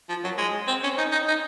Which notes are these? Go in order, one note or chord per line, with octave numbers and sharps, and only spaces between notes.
F3
F#3
G#3
C4
C#4
D#4
D#4
D#4